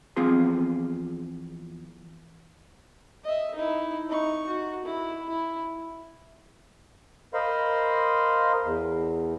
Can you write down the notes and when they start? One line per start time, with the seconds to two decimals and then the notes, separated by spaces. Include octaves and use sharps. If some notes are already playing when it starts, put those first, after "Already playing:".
0.16 E2 F3 C4 F4 G#4 C6
3.23 D#5 E5
3.55 D#4 E4
4.09 D#4 C#6
4.47 F#4
4.85 E4
5.29 E4
7.34 A#4 C5 D#5 F5 B5 C6
8.63 E2